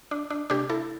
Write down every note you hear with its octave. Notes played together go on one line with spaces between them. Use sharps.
D4
D4
C3 A3 D4 G4
E4 A4